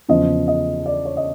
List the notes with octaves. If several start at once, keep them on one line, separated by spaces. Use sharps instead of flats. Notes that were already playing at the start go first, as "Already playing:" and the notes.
E2 C#3 F3 D#5
D#5
D5
C#5
D#5